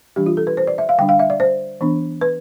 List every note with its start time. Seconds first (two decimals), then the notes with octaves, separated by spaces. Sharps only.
0.16 E3 G3 D4 G4
0.26 F4
0.37 A4
0.47 B4
0.57 C5
0.67 D5
0.78 E5
0.89 F5
0.98 D3 G3 D4 G5
1.09 F5
1.19 E5
1.30 D5
1.40 C5
1.81 E3 B3 D4
2.21 B4